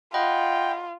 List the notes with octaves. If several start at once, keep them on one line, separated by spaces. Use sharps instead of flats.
F4 D#5 F#5 G5 B5